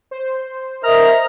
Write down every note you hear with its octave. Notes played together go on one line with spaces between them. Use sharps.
C5
A#4 D#5 E5 A#5 F6